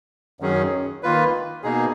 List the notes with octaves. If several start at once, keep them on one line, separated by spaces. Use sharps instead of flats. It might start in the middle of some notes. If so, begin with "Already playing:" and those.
F#2 D#3 F#3 C#4 G#4
D#3 A#3 F4 B4
B2 A#3 D#4 G#4